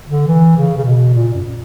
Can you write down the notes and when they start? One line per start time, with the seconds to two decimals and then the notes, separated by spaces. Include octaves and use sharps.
0.09 D3
0.28 E3
0.57 C#3
0.78 C#3
0.85 B2
1.14 A#2
1.35 F#2